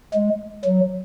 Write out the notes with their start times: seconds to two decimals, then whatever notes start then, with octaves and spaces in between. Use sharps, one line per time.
0.14 G#3
0.65 F#3